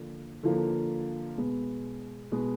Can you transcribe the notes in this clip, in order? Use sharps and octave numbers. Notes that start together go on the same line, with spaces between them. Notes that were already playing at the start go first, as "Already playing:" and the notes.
Already playing: D3 F3 A#3
D3 F3 A#3
B2 G#3 B3
B2 G#3 B3